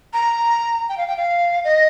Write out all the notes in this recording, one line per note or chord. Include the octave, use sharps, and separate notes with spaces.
A#5
G5
F5
G5
F5
D#5